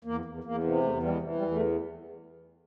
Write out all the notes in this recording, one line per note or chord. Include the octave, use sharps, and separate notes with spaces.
E2 A#3
E2
E2 A#3
C3
E2 A3
E3 G3
G#3
E3
G3
E2
A3